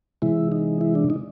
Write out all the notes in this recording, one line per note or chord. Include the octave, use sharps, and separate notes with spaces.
C3 E3 G#3 E4
D#4
E4
D4
D#4